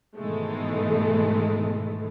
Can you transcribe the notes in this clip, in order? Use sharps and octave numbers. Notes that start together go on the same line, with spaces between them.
G#2 B2 D#3 E3 G#3 A3